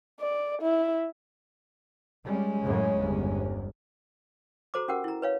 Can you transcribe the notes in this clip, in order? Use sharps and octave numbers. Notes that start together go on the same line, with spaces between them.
D5
E4
G3 G#3 C#4
F#2 A2 C#3
G1 E2
F#4 A4 C5 A#5 D6
C#4 F#4 G4 A#4 F#5
E4 A#5
B4 C#5 F5